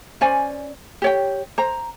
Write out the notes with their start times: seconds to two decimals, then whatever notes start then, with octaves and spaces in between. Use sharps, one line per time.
0.21 C#4 C5 D5 G#5
1.02 G4 C#5 G5
1.58 C5 A#5